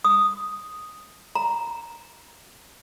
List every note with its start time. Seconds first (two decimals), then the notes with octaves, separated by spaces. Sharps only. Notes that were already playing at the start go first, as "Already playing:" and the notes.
0.04 D#6
1.35 A#5